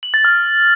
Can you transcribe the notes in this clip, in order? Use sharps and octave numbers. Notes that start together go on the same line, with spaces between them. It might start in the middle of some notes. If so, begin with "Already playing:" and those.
F#7
A6
F6